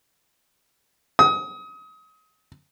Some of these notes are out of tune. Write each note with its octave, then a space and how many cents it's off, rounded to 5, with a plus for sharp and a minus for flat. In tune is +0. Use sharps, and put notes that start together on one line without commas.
D#6 +30